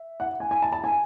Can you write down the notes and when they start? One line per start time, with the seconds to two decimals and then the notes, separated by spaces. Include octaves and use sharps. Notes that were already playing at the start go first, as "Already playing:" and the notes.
Already playing: E5
0.20 F#5
0.40 G#5
0.51 G#5
0.62 A5
0.72 A5
0.84 G#5